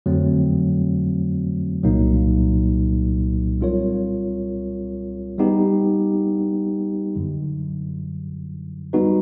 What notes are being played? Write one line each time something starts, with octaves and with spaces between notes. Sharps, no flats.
F2 D3 F#3 A3 C4
C2 A#2 F#3 A#3 D#4
G3 C4 F4 A#4 C#5
G3 B3 D#4 G4
F#2 D3 F#3
G3 B3 D#4 F#4 B4